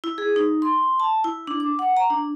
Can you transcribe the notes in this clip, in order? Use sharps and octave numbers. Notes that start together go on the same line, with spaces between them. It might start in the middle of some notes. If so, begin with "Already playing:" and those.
E4
G#4
D#4
C6
A5
E4
D4
D6
F#5
A#5
D4